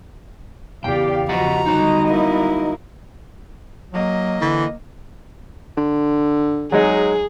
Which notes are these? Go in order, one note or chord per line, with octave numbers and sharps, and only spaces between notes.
E2 C#3 G4 D5 F5 G5
F3 F#4 G4 D#5 F#5 A#5
D3 F#3 G3 D#4 F#4 D#5
A#3 E4
F#3 A#3 D#5
D3 E3
D3
F#3 G#3 D#4 G#4